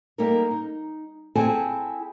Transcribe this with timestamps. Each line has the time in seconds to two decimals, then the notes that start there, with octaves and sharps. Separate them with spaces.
0.18 G3 A#3 D#4 A4 A#4
0.51 D#4
1.35 C4 E4 G#4 A4 G#5 A5